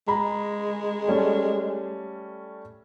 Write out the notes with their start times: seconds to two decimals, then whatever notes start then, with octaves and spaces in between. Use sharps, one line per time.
0.08 G#3 A#5 B5
1.08 G3 A3 C#4